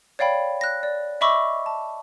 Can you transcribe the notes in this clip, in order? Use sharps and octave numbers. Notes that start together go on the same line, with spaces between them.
C#5 D5 F5 G5 B5
F#6 A#6
D5
D#5 E5 B5 C#6 D6 E6
A5